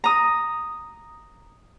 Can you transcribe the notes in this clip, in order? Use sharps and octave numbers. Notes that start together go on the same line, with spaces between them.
A#5 D#6